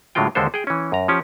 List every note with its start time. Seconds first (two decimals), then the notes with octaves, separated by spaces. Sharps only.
0.15 A2 D3 F#3 G#3 F4 G5
0.35 D#2 D3 G#3 D4 A4 C5
0.54 G#4 G5
0.67 E3 C#4
0.92 F#2 A#5
1.08 F3 C#4 G4